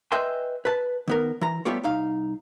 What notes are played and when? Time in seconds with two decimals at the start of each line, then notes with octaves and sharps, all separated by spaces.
0.12 B4 D#5 E5 G5 G#5 C6
0.65 B4 A5
1.08 D#3 B3 A#4
1.41 E3 A#5
1.65 G3 A3 B3 F4 G4 C#5
1.84 C2 D#4 F5